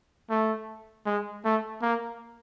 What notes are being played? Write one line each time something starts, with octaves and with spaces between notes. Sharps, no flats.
A3
G#3
A3
A#3